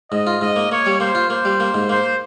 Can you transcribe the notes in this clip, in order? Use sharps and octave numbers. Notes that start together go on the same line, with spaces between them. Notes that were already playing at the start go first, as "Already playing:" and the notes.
G#2 D#5
F4
G#2 D#5
A#3
A#3 C#5
G3
A#3 C5
F4
A#3 C5
G3
A#3
G#2
A#3 C5